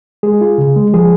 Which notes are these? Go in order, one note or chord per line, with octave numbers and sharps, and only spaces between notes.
G#3 G#4
F4
C#3
G#3
F3 G#4